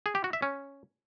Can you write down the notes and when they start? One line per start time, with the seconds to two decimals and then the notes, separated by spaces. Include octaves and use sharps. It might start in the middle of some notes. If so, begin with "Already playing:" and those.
0.06 G#4
0.15 G4
0.24 F#4
0.33 E5
0.42 C#4